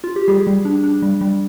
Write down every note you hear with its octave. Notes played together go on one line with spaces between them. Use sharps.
F4
G4
G3 G#4
G3
D4
D4
G3
G3